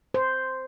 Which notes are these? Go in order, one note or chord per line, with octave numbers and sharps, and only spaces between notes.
C5